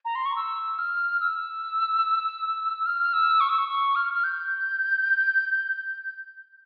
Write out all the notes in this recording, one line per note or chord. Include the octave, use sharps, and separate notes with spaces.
A#5
C6
C#6
E6
F6
E6
F6
E6
C#6
E6
C#6
C#6
F6
F6
G6